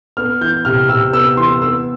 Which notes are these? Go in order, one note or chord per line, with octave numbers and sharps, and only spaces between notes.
B3 F6
E3 G6
C3 F6
C3 E6
B3 E6
E3 C6
B3 E6